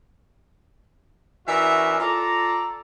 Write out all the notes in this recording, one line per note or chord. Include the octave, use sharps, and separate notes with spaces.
E3 C#4 D4 F#4 A#4 E5
F4 A4 D5 A#5